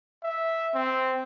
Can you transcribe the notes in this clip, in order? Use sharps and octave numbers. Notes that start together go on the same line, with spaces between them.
E5
C4